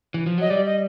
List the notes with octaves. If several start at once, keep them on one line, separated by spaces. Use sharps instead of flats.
E3
F3
F#3 D#5
G3 D5
D#5